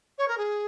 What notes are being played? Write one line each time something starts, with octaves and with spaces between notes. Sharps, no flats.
C#5
A#4
G#4